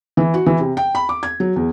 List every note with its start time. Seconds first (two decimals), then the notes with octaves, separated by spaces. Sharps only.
0.17 E3
0.34 F#4
0.46 E3
0.60 C3
0.77 G5
0.95 B5
1.09 D6
1.23 G#6
1.40 F#3
1.56 E2